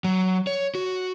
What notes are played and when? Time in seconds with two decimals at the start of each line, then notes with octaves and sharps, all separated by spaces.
0.04 F#3
0.47 C#5
0.75 F#4